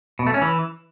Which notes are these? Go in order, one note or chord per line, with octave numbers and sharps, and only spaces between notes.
B2
A3
C#4
E3